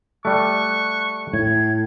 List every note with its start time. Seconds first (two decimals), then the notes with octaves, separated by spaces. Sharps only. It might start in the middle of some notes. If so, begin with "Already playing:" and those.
0.25 G3 A3 C#6 F#6
1.33 A2 G#6